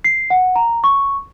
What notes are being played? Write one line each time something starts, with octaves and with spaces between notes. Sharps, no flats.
C7
F#5
A#5
C#6